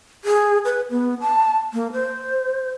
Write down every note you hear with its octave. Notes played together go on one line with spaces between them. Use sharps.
G#4
B4
B3
A5
A#3
C5